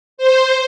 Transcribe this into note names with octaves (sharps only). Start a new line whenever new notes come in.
C5